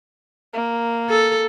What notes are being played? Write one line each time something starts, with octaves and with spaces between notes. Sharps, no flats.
A#3
A4